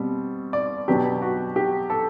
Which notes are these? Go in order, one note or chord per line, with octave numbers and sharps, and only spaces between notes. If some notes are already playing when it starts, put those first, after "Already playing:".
Already playing: B2 G3 C4
D5
B2 F#3 B3 D4 G4
F#4
G4
A4